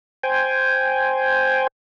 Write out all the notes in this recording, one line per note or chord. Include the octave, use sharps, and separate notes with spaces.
C5 G5 G#5